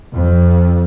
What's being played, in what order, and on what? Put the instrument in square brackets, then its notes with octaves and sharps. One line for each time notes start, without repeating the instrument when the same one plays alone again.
[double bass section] F2